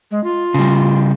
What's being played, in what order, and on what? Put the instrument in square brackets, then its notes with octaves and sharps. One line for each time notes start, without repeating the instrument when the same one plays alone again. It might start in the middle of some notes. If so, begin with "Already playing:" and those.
[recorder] G#3
F4
[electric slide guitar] C#3 G3